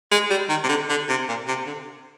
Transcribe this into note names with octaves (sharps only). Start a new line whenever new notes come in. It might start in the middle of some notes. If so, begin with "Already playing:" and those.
G#3
G3
D#3
C3
D3
D3
C3
A#2
C3
D3